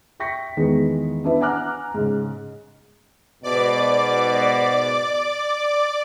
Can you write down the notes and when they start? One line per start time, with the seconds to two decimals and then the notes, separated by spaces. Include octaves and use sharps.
0.20 E5 G5 C#6 A#6 B6 C#7
0.57 E2 D#3 E3 G#3 B3
1.24 B3 D4 E4 B4 E5
1.41 F#5 G#5 A#5 D6 F6 F#6
1.94 G#2 C#3
3.43 G#2 B2 D5 D6